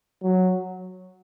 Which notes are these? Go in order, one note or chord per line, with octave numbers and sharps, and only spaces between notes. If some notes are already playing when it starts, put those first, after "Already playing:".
F#3